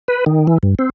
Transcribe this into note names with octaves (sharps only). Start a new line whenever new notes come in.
B4
D#3
E3
G2
C4